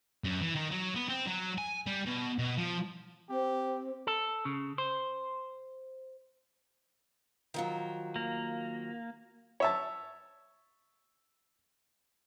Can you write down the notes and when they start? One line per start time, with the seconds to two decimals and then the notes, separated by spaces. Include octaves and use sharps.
0.24 F#2
0.41 E3
0.56 D#3
0.71 F#3
0.96 B3
1.09 C4
1.27 F#3
1.58 G#5
1.86 G3
2.06 B2
2.39 B2
2.57 F3
3.29 C4 G4
4.07 A4
4.45 C#3
4.78 C5
7.54 D#3 F3 F#3
8.16 A#3
9.60 C#5 E5 A5